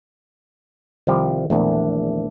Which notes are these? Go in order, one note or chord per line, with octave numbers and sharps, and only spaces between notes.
C2 D#3 F3 G4
A#1 E2 A3 D4